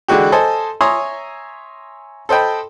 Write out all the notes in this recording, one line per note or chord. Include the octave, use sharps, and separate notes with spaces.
D3 E3 G#3 F#4 G4
A4 C5 D#5 G#5 A5
C#5 E5 G#5 A#5 C6 D#6
A4 C5 D#5 G5 B5